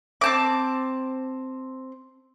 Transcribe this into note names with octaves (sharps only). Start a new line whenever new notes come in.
C4 A5 D6